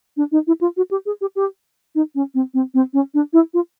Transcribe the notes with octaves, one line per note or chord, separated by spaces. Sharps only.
D4
D#4
E4
F4
F#4
G4
G#4
G4
G4
D#4
C#4
C4
C4
C4
C#4
D4
E4
F4